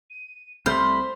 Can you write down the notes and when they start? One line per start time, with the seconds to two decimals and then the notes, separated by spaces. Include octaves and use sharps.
0.10 D#7
0.66 C2 C3 A3 C5 B5 F6 G6